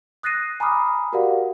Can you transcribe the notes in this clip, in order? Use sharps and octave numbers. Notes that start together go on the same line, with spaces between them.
D#6 F#6 A6 A#6 C7 D#7
G#5 A#5 B5 D6 D#6 F6
F#4 G4 A#4 D5 F5 F#5